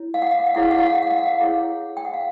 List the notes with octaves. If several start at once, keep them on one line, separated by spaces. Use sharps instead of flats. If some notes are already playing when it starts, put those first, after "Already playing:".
Already playing: E4 C#5
F5
F#5
F5
F#5
F5
E4 G#4 C#5 F#5
F5
F#5
F5
F#5
F5
F#5
F5
F#5
F5
E4 G#4 C#5
G5
F#5
F5